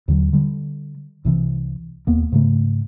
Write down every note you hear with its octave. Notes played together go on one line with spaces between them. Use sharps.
D#2 D3 F#3
D3 G3
C2 C3 E3
D#1 D#2 A#3 B3
G#2 C#3 A3